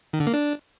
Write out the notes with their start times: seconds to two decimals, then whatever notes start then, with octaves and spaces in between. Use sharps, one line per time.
0.13 D#3
0.20 D3
0.27 A#3
0.34 D4